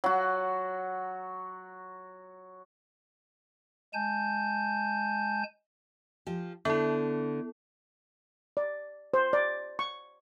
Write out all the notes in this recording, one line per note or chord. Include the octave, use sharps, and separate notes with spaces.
F#3 F#4
G#3 G#5 A5 G6
F3 G4
D3 B3 E4
D5
C5
D5
C#6